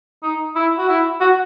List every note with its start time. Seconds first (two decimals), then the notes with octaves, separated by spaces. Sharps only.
0.23 D#4
0.56 E4
0.78 F#4
0.89 E4
1.21 F#4